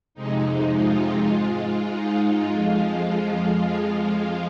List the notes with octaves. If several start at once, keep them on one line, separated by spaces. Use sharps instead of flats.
F2 C3 G#3 D#4
F4
G#2 G#3
D#4
F4
F2 F3 G#3
F4